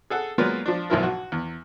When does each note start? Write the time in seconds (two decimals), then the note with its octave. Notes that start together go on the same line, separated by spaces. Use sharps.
0.10 G#4 A4 F#5
0.38 F#3 G#3 A#3 B3 F4 D5
0.66 F3 D4
0.90 B1 G#2 E3 F3 E4 A#4
1.03 F#4
1.32 E2